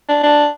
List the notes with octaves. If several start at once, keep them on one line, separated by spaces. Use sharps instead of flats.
D4
D4